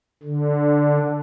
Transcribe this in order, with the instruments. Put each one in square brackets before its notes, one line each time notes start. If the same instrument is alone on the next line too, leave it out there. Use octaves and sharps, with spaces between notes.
[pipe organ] D3